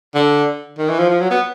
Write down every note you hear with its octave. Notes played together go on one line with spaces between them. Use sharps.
D3
D#3
E3
F3
F3
F#3
B3